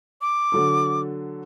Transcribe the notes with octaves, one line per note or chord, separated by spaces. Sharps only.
D6
D3 F#3 A4